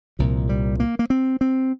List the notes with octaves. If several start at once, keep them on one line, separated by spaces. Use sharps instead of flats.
C2 A#2 F3
G3
A#3
A#3
C4
C4